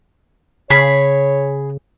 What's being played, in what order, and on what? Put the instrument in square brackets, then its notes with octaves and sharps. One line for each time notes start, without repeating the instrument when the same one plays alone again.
[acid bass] C#3 [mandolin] G#4 B5 [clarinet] C#5